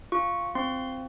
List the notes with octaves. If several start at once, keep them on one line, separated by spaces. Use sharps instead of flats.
F4 C#6
C4 C6